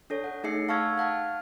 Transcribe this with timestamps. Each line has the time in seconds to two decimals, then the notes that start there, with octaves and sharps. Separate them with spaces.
0.10 D4 A4 C#5
0.24 F#5
0.43 A3 D#4 G#4 E5 C7 C#7
0.69 F5 A5 C#6 E6 F6 G#6
0.98 F5 F#5 A5 F6